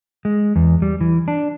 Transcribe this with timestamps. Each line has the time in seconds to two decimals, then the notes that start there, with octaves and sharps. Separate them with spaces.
0.25 G#3
0.56 E2
0.82 G3
1.01 E3
1.28 D4